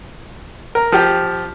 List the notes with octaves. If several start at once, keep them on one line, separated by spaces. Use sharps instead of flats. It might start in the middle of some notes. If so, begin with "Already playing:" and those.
A#4
F3 G4